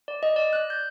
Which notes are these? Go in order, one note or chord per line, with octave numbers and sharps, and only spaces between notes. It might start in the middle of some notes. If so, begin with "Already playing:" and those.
D5
D#5
D5
F#6
G6